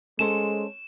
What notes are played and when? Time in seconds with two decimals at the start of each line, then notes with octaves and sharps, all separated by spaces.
0.19 G#3 C#4 A4 C5 E7